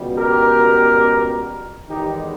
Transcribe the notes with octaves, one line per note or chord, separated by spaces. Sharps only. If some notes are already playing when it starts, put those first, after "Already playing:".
Already playing: C#2 B2 G3 B3
G4 A#4
E2 D#3 G#3 B3 D#4 G4